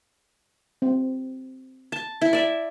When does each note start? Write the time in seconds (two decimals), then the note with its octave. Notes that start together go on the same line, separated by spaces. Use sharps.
0.82 C4
1.92 A5
2.22 E4
2.33 D5 E5